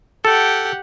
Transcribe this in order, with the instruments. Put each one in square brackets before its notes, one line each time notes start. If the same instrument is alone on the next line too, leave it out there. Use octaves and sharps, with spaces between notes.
[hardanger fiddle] G4 F#5 [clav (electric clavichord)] A4